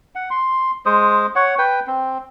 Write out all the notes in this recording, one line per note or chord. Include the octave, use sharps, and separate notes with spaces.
F#5
C6
G#3 C5 D#6
C#5 F#5
B4 G5
C4